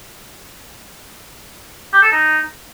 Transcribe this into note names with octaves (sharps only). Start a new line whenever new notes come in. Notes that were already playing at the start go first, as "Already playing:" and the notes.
G4
A4
D#4